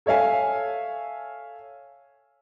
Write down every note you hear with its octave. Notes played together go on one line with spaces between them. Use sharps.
A4 C#5 E5 F5 G#5